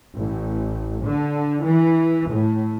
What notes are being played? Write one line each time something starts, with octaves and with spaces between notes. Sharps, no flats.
A1
D3
E3
A2